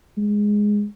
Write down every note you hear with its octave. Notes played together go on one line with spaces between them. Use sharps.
G#3